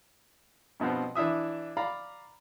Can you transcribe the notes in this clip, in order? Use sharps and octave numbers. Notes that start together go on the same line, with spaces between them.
G2 B2 F3 B3 C4
E3 D4 E4 E5 D#6
D5 F5 A#5 B5